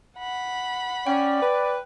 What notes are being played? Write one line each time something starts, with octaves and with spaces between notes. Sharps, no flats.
F#5 B5
C#4 D5 G5
B4